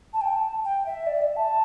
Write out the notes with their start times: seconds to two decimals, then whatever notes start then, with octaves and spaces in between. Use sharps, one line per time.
0.13 A5
0.21 G5
0.36 A5
0.65 G5
0.86 E5
1.07 D5
1.21 E5
1.36 A5